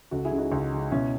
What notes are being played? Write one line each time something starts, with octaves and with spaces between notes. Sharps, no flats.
C#2 F#4 A4
E4 G#4
C#3 G#3
D#4 F#4
C#2
C#3 G#3
B2 C#4 E4